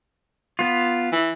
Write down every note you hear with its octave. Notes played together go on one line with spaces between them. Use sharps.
B3 F4
E3